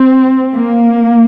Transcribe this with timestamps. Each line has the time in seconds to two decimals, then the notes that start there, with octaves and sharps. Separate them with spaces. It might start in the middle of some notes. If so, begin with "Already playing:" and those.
Already playing: C4
0.54 A#3